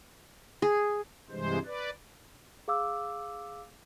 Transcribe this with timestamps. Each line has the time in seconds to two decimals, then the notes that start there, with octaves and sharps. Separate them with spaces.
0.62 G#4
1.30 G2 C3 E3 G#3 C5
1.65 B4 D5
2.68 G#4 F5 D6 E6